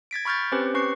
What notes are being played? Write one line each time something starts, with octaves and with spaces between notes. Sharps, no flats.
G#6 A6 B6 D7
B5 C#6 F6 G6 A6
C4 C#4 G4 B4 C5
C#4 B4 C#6 C7